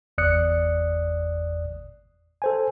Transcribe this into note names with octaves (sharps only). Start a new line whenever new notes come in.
G1 E2 D5 D#6 F#6 C#7
A4 C5 G#5